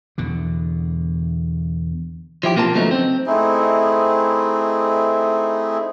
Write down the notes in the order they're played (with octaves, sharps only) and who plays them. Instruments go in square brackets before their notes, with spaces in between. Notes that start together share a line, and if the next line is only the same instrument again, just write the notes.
[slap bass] E2 B2 D3
[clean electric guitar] F3 E4 G4
B1 A#2 A#3 C4 F4 A5
C#3 F3 F#3 A3 B3 D#4
C4
[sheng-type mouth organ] A3 C4 D#4 E4 G#4